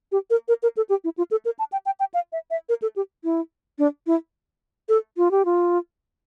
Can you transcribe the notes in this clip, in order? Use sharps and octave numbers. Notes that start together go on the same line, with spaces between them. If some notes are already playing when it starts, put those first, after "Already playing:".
G4
A#4
A#4
A#4
A4
G4
E4
F4
A4
A#4
A5
G5
G5
G5
F5
E5
E5
A#4
A4
G4
E4
D4
E4
A4
F4
G4
F4